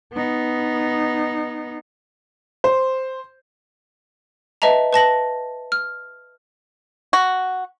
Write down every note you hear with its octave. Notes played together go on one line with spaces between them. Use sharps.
B3 D#4
C5
B4 D#5 E5 A5 A#5
B4 A5 A#6 F#7
F6
F#4